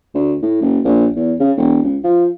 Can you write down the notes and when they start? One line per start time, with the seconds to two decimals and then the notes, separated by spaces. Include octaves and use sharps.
0.15 D2
0.42 A2
0.62 F#1
0.85 A#1
1.16 E2
1.40 C#3
1.57 E1
1.83 C#2
2.04 F3